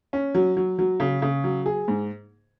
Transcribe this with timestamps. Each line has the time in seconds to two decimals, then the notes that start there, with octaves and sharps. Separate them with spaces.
0.13 C#4
0.35 F#3
0.57 F#3
0.79 F#3
1.00 C#3
1.22 C#3
1.44 F#3
1.66 G#4
1.88 G#2